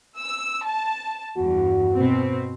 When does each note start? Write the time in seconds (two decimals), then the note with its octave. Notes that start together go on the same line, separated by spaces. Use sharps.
0.19 E6
0.66 A5
1.37 E2 G2 F#4
1.94 B2 C4